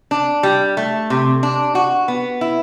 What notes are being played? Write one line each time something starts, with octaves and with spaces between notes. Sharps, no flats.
D4
G3
A3
C3
D4
F#4
B3
E4